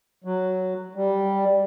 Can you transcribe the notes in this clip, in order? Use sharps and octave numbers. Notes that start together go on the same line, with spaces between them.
F#3
G3